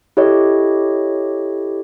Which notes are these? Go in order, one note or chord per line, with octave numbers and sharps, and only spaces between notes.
E4 G4 A4 C#5 D#5